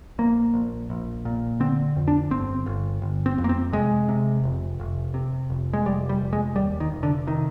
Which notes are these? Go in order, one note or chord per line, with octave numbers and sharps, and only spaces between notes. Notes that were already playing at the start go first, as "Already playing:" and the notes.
A#1 A#3
A#1
A#1
A#2
D3 C4
F2
D4
G1 C4
G1
G1
C4
F2
A#3
C4
C3 G#3
C3
F1
F1
C3
F1
G#3
F1 G3
G3
F1
G#3
D#2 G3
D#3
F1
D3
C3 D#3